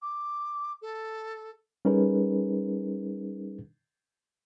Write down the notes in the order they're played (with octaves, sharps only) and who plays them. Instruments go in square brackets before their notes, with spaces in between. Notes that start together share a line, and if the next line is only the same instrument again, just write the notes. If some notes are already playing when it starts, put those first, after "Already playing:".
[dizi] D6
A4
[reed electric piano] G3 C#4 D#4 G#4 A#4 B4